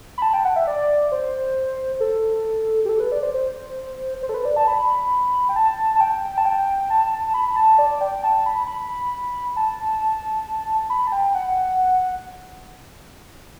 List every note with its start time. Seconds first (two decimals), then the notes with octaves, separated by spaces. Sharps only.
0.18 B5
0.22 A5
0.33 G5
0.45 F#5
0.56 E5
0.67 D5
1.12 C5
2.00 A4
2.85 G4
2.89 A4
3.00 B4
3.12 D5
3.23 C5
3.34 C5
4.23 C5
4.29 A4
4.34 B4
4.45 D5
4.56 A5
4.67 B5
5.49 G5
5.56 A5
5.96 A5
6.01 G5
6.38 A5
6.45 G5
6.90 A5
7.13 A5
7.34 B5
7.48 B5
7.56 A5
7.78 D5
8.01 G5
8.24 A5
8.46 B5
8.67 B5
9.56 A5
10.90 B5
11.07 A5
11.12 G5
11.35 F#5